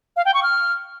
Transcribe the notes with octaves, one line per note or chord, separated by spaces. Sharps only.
F5
G5
C#6
F6